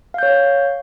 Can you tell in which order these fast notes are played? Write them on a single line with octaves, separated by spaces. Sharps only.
F5 G6 C#5